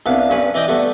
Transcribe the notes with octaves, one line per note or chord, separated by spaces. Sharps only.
C2 B3 D4 F5
G2 C#4 B4
E3 D5 D#5 G5 D#6
G3 A3 B3